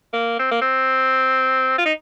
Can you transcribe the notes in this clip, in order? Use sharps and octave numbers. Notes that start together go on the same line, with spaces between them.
A#3
C4
A#3
C4
F4
D#4